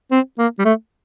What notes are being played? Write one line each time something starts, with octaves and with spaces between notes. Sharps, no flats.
C4
A#3
G3
A3